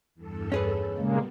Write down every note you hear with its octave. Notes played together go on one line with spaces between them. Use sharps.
E2 G2 A4
C#4 G#4 B4
A#2 C#3 G3 G#3 A#3 B3